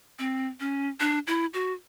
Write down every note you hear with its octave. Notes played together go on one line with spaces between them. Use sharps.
C4
C#4
D4
E4
F#4